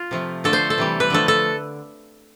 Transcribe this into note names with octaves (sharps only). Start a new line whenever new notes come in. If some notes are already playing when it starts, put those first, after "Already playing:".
Already playing: F4
C3 F3 A3
D3 F3 A3 A4
C5
A4
C3 E3 G3
B4
D3 F3 A3 A4
A4